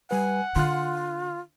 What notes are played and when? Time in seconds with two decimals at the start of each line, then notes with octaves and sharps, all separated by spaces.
0.11 G3 B4 F#5 G#5
0.56 D3 F4 C6 F#6